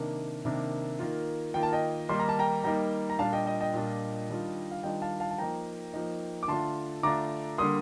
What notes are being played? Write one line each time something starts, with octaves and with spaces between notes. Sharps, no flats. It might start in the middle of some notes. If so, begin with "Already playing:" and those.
Already playing: C3 D#3 A#3 D4
C3 D#3 A#3 D4
D#3 A#3 F4
D#3 A#3 F4 G5
A5
D#5 G5
D#3 G3 A#3 D#4 C6
A#5
A5
G5 A#5
D#3 G3 A#3 D#4 G5 A#5
A#5
A#2 G3 D4 F4 F5 A5
D#5 G5
D#5 G5
D#5 G5
A#2 G3 D4 F4
D#3 G3 D4 F4
F5
D#3 G3 D4 F4 D#5 G5
F5 A5
F5 A5
A5
F3 A#3 D#4 G5 A#5
F3 A#3 D#4
D6
D3 A3 D4 F4 A5 C6
D3 A3 D4 F4 A#5 D6
D3 G3 A#3 C6 D#6